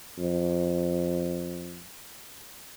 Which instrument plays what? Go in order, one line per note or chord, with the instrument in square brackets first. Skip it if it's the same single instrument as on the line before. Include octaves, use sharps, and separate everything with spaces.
[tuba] F2